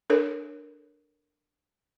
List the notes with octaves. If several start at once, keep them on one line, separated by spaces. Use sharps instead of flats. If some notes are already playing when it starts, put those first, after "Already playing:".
D4 A4 A#4 C#5